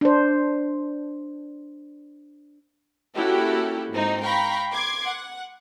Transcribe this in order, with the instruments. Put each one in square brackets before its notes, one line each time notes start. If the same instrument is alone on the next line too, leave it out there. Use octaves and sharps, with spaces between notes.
[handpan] D4 C5
[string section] A#3 C#4 E4 F#4 G4 A4
G#2 C4 D#4
F5 G5 A#5 B5 C#6
C6 D6 G#6
F#5